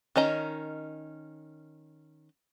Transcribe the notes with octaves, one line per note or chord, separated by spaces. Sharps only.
D#3 C#4 D#5 A#5